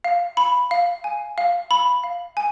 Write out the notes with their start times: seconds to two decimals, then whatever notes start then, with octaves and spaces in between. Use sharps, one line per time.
0.04 F5
0.37 B5
0.71 F5
1.04 G#5
1.38 F5
1.71 B5
2.04 F5
2.37 G#5